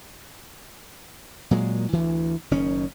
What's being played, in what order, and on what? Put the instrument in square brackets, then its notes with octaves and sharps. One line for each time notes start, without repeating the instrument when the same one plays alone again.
[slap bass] A#2 F#3 G#3
D2 E3
F#1 D#3 C#4